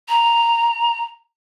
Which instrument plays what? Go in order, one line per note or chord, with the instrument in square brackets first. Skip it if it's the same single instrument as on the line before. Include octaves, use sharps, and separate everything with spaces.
[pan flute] A#5